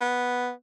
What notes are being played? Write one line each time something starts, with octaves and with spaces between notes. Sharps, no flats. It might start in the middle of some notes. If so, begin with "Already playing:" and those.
B3